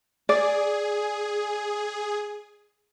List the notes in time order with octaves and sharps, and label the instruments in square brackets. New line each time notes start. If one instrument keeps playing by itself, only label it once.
[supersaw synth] G#4 [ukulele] D5